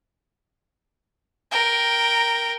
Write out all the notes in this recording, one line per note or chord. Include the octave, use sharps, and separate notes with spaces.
A#4 G5